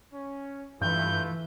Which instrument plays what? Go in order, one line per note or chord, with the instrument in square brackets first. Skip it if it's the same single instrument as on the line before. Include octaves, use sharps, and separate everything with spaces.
[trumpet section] C#4
[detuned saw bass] G2 [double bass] E3 [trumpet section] A3 F4 B4 [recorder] G6